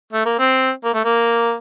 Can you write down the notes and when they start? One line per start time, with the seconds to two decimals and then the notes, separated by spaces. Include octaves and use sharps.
0.13 A3
0.26 A#3
0.39 C4
0.84 A#3
0.94 A3
1.04 A#3